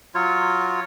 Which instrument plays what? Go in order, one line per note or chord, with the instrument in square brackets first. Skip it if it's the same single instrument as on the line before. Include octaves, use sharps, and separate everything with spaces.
[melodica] F#3 F4 C#5